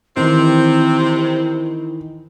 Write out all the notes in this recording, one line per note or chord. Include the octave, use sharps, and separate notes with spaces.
C3 D#3 E3 C4 D#4 E4